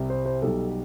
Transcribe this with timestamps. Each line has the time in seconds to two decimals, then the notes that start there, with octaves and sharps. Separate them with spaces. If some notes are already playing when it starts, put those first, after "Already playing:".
Already playing: C2 C3 G3
0.10 C5
0.26 C5
0.42 B1 B2 G3 A4